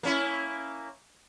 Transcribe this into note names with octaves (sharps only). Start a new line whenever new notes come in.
A#3 C#4 E4